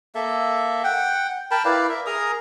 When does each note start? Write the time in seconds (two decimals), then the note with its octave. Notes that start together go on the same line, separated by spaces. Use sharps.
0.15 A#3 A4 E5
0.84 F#5 G5
1.51 A#4 G5 A5 B5
1.65 E4 B4 D5 F5
1.89 A#4 E5
2.06 G#4 A#4 A#5 D#6